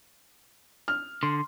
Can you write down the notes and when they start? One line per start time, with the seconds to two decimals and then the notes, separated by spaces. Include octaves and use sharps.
0.88 F6
1.23 D3 C6